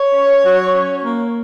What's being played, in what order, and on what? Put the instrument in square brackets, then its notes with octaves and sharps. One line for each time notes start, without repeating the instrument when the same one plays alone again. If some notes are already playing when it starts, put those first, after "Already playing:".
Already playing: [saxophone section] C#5
C#4
F#3
C#4
A#3